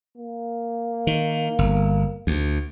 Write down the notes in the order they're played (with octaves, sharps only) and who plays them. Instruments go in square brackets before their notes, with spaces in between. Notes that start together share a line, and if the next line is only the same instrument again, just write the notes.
[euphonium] A#3
[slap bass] D#3
G1
D2